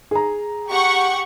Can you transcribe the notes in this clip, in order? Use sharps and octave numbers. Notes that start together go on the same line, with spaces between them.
G#4 A#5
G4 F#5 C#6